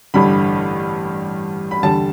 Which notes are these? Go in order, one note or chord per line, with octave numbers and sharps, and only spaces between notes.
A1 G2 D3 G3 B5
B5
E2 D3 G3 A5